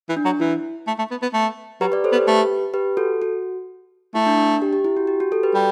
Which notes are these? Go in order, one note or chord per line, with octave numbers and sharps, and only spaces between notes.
E3
D4
F#3
E3 E4
A3
A3
B3
B3
A3
F#3 G4 B4
B4 D5
A4 C5
B3
G4 B4
A3 G4 B4
G4 B4
F#4 A4
F#4
A3 E4
D4
D4
G4
G4
E4
F#4
G4
F#4
F#4 A4
G4 B4
G3